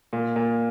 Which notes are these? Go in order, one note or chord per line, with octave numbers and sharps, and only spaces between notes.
A#2
A#2